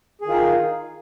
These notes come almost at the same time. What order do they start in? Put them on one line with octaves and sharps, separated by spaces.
G#4 D#3 F4 D#4